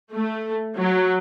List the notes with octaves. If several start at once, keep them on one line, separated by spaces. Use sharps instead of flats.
A3
F#3